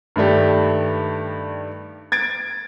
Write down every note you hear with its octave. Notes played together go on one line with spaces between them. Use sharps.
G2 D#3 A3 D4 G4
G#6 A6 D7